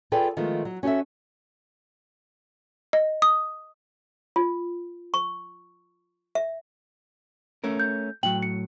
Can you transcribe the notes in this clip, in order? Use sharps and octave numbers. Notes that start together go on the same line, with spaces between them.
F4 G#4 A4 B4 D5 G5
D#3 F3 G#3 A3 B3
F#3
C#4 F#4 G4 A4 E5
D#5
D#6
F4
C#6
E5
A3 C#4 A#4
G6
A2 F#3 G5 F#7
C#7